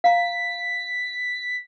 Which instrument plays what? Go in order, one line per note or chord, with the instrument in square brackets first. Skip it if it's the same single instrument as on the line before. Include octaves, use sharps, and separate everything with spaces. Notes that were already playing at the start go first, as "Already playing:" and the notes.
[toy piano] F5 A#5 [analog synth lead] B6